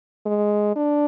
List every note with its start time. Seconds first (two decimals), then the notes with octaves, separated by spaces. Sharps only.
0.26 G#3
0.76 D4